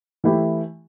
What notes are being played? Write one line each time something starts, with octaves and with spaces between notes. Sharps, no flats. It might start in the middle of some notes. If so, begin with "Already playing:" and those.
E3 A3 E4 G4